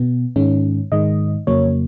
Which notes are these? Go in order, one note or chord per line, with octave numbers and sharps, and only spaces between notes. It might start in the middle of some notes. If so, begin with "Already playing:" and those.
Already playing: B2 B3
G#2 D#3 G#3 C#4
G#2 D#3 G#3 D#5
F2 C#3 F#3 A#3 C#5